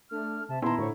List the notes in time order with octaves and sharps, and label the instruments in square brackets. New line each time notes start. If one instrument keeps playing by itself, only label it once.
[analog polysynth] A3 [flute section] D4 F6
[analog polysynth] C3 [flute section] E5 A5
[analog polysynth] A#2 D#3 [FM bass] B3 [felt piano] E4 A#5 [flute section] A5 C6
[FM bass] A2 [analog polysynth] D3 [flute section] C5 C#5 C#6